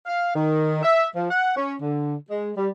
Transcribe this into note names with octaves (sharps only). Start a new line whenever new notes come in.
F5
D#3
E5
F3
F#5
C#4
D3
G#3
G3